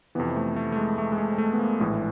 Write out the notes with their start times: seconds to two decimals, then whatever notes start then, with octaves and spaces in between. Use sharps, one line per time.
0.15 F2 C3 E3 B3
0.36 A3
0.56 A3
0.72 A3
0.77 G#3
0.98 A3
1.12 G#3
1.18 A3
1.38 A3
1.53 B3
1.59 A#3
1.79 A#1 A2 E3 G#3